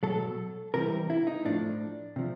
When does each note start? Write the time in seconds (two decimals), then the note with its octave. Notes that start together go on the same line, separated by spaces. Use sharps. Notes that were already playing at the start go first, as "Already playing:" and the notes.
0.03 B2 F#3 A4
0.74 C3 E3 G3 A#4
1.10 E4
1.27 D#4
1.45 A2 F3 D4
2.16 C3 F3